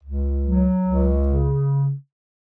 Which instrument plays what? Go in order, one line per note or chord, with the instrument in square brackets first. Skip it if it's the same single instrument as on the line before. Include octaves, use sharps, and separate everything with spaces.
[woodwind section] C#2
F#3
C#2
C#3